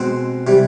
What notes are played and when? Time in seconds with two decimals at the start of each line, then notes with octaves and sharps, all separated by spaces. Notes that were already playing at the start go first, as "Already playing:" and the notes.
Already playing: B2 G#3 C4 F#5
0.47 C3 E3 G3